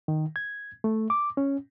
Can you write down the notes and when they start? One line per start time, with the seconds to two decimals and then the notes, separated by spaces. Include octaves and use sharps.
0.08 D#3
0.36 G#6
0.84 A3
1.10 D6
1.37 C#4